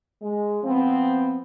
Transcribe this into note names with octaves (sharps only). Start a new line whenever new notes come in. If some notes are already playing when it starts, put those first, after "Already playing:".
G#3
F3 B3 C4